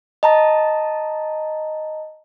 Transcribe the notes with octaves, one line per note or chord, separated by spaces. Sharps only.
D#5 A5 A#5